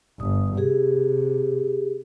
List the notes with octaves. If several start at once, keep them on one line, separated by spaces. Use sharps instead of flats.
G1 D#6
C3 G4 G#4